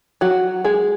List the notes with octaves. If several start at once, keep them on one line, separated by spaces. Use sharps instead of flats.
F#3 F#4
G#3 G#4